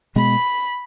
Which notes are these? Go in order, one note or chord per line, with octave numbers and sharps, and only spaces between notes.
B2 G#3 B3 B5